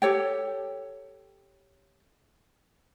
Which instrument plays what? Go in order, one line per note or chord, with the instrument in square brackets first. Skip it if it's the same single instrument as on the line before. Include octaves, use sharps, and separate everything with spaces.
[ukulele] G4 A4 C#5 G5